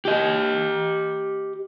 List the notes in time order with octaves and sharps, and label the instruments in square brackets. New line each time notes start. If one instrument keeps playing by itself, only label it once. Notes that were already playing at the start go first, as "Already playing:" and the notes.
[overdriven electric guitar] G4 D#5